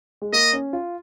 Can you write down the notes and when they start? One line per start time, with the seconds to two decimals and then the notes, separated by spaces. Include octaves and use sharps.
0.22 G#3
0.33 A#3 D#5
0.53 C#4
0.73 F4